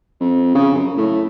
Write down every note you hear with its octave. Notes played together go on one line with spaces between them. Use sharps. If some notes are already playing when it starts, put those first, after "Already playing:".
F2
C#3
F#2
A2